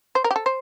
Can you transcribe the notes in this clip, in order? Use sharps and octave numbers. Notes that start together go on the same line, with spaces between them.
C5
A#4
G4
A4
C5